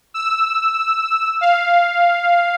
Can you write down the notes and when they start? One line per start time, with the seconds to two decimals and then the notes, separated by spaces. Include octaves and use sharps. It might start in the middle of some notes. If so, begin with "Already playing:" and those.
0.14 E6
1.41 F5